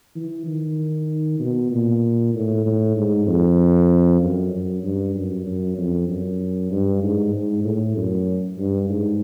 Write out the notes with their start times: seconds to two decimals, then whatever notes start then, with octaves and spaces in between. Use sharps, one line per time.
0.16 E3
0.46 D#3
1.40 B2
1.71 A#2
2.34 A2
2.66 A2
2.96 G#2
3.27 F2
4.21 F#2
4.52 F#2
4.83 G2
5.15 F#2
5.47 F#2
5.78 F2
6.08 F#2
6.71 G2
7.03 G#2
7.33 G#2
7.64 A2
7.96 F#2
8.58 G2
8.90 G#2